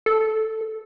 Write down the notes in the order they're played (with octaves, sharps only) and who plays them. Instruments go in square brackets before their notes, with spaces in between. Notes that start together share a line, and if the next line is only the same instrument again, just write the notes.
[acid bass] A4